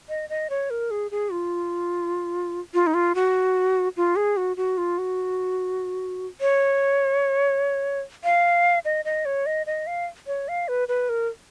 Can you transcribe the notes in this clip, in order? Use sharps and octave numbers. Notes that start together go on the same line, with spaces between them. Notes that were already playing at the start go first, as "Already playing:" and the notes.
D#5
D#5
C#5
A#4
G#4
G#4
F4
F4
D#4
F4
F#4
F4
G#4
F#4
F#4
F4
F#4
C#5
F5
D#5
D#5
C#5
D#5
D#5
F5
C#5
F5
B4
B4
A#4